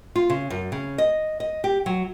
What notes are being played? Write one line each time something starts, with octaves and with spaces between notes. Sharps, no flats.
F4
C#3
F#2
C#3
D#5
D#5
G4
F#3